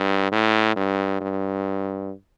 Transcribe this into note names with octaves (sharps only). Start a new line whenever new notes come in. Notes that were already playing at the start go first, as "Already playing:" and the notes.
Already playing: G2
A2
G2
G2